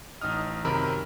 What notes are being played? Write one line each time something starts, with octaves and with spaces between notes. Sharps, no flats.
A1 D#4 D#6 F6
F#2 C3 D#3 A#4 B5 E6